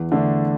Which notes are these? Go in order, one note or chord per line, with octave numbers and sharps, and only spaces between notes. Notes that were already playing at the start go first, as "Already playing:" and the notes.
Already playing: E2
D3 A3 D4